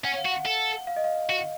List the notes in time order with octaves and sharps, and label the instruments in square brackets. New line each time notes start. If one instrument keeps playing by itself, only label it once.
[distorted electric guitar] C#4 [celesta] F#5
[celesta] F5
[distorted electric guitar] F#4
[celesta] F#5
[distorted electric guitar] A4
[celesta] F5
D#5
F5
[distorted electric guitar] F#4